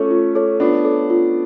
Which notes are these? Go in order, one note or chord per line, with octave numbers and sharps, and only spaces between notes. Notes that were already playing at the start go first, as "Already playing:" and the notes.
Already playing: A3 C#4 F4 A4 C#5
F4
A4 C#5
B3 D4 F4
A4 C#5
F4